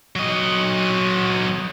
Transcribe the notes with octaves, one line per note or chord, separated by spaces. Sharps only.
F#3 D#5